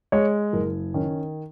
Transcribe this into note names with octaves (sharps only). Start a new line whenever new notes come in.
G#3 C#5
F#1 A#4
D#3 C#4